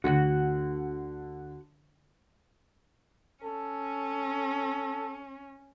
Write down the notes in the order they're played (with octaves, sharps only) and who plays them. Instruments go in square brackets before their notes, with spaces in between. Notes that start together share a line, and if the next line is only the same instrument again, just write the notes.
[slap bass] D2 [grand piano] D3 [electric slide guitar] F#4 F#5
[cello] C#4 [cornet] A4